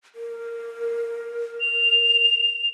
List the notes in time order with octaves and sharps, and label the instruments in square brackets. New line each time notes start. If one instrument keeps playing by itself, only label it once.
[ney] A#4
[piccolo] F7